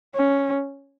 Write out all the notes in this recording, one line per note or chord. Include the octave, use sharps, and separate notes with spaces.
C#4